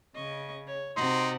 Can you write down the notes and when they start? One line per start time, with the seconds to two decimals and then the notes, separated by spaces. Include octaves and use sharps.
0.15 C#3 D#5 C#6
0.67 C#5
0.97 C3 D#4 F#4 F#5 C6